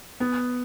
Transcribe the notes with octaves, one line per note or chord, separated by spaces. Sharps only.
B3